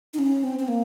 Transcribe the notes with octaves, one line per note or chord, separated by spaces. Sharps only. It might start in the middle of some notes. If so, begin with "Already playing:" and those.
D#4
C#4
C4
C4
A#3